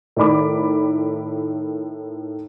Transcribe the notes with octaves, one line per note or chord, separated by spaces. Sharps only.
A2 D#3 D5 B5 D6